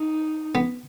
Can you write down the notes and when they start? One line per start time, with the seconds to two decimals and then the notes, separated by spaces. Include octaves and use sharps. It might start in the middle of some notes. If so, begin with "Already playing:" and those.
Already playing: D#4
0.55 B3